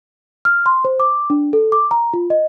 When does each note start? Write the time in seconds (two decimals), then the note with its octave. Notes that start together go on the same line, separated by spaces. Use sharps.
0.45 F6
0.66 C6
0.85 C5
1.00 D6
1.30 D4
1.53 A4
1.72 D6
1.91 A#5
2.14 F4
2.30 D#5